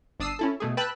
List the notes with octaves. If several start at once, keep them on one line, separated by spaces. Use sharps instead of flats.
G1 D4 D#6 E6 C7
C#4 E4 A4
B2 A3 G#4
B4 G5 A5 B5 E6 F#6